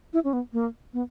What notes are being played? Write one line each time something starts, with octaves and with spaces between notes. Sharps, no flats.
E4
C#4
B3
A#3
B3